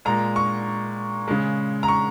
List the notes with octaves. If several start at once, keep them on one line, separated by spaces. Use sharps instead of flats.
A#2 G#3 A#5
C#6
C#3 G#3
A#5
C#6